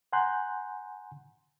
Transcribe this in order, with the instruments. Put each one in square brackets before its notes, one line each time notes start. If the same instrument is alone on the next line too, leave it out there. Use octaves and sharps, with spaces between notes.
[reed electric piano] F#5 G#5 A#5 C6 F#6 G6